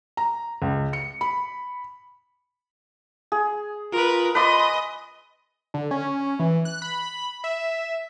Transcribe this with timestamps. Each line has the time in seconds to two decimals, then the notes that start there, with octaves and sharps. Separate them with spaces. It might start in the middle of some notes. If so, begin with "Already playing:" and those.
0.17 A#5
0.62 C#2
0.93 C#7
1.21 B5
3.32 G#4
3.92 F4 A#4 B4
4.35 B4 D5 D#5 B5 C6
5.74 D3
5.91 C#4
6.39 E3
6.65 F#6
6.82 B5
7.44 E5